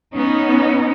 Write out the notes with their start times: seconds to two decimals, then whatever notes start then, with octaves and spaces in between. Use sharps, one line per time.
0.13 B3 C#4 D#4